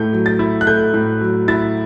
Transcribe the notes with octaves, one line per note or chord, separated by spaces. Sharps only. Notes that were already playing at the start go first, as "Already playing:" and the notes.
Already playing: A2 A3 G6
F#3
A6
E4
F#6
A3 G6
A2
F#3
E4 A6